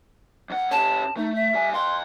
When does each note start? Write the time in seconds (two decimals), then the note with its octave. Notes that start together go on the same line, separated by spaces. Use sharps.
0.50 F2 F#5
0.71 C#4 G4 A5
1.17 A3 D#4
1.35 E5
1.54 G3 G#5
1.74 F5 G5 C6